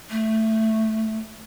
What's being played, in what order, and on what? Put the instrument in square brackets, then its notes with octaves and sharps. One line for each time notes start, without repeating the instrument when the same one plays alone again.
[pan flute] A3